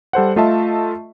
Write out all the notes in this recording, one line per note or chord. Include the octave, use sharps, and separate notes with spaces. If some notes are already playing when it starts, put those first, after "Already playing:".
G3 A4 C5 F#5
A3 F4 D#5 E5 A5